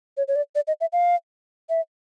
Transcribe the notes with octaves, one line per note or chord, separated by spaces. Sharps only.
C#5
C#5
D5
D5
D#5
E5
F5
E5